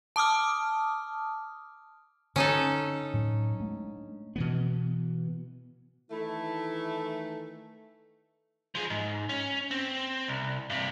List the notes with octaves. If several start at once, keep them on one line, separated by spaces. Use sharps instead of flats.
A5 D6 D#6 F6
D3 C#4 D#4 A4
A2 F#3
G#3 A3 D4
B2 E3 B3
D#3 E3 A3 E4
F3 G#4
G#2
C#4
C4
C2
G2 C3